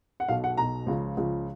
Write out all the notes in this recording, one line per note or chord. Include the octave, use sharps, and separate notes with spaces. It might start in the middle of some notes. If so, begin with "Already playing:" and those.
F#5
B1 B2 F5
F#5
B1 B2 A#5
C#2 C#3 F3
C#2 C#3 F3